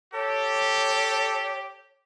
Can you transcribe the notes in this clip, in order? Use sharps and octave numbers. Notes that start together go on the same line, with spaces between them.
G4 A4 C#5